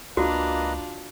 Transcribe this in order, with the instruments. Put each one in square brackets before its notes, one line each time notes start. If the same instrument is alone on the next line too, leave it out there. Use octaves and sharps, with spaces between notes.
[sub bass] C#2 [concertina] A#3 B4 D#5 [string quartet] D4 F4 [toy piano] F#4